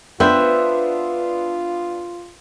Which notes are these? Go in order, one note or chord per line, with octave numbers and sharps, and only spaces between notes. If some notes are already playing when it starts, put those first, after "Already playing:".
B3 D4 F4 B4 C5 E5 G5